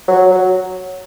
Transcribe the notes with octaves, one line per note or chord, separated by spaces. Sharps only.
F#3
F#3